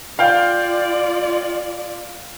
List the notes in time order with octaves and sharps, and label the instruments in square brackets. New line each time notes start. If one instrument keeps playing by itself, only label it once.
[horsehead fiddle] F4 D5 [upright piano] F5 G5 G6